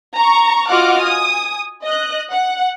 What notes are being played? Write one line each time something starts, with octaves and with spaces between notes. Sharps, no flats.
A#5 C#6
F4 F#4 D#5 F#5 D6 F6
G#5 D#6
D#5 F#6
F#5